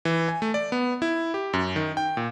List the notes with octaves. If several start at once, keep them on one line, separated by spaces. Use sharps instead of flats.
E3
G#5
A3
D5
B3
E4
G4
F#2
D#3
G5
A#2